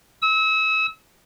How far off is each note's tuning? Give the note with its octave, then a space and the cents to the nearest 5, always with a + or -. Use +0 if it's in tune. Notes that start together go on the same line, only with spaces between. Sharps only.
E6 -35